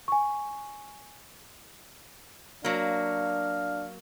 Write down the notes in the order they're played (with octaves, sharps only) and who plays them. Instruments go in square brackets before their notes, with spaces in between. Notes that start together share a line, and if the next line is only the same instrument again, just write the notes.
[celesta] G#5 C#6
[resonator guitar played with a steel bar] F#3 A#3 [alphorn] D4 [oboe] F5